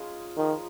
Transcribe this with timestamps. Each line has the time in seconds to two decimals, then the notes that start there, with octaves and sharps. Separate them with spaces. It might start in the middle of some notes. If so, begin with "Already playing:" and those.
Already playing: G#3 C#4 D#4 F4 G#4
0.37 D#3 F3 G#3 D#4